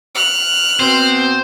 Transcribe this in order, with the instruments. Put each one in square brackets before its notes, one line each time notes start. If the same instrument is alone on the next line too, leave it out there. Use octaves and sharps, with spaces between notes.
[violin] F6 F#6
[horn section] B2 C4 [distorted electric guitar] C5